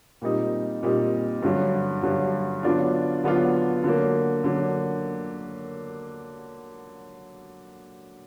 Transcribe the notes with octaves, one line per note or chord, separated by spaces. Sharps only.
A#2 G3 C4 D#4
A#2 G3 C4 D#4
G2 D3 F#3
G2 D3 F#3
D3 F#3 B3 D4 F4
D3 F#3 B3 D4 F4
D3 F#3 A#3
D3 F#3 A#3